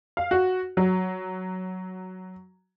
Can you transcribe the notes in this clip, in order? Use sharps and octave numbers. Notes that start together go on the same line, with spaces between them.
F5
F#4
F#3